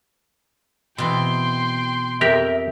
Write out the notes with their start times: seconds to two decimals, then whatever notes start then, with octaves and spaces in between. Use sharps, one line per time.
0.98 B2 E3 C4 G5 C6
2.21 F2 G4 A#4 D#5 E5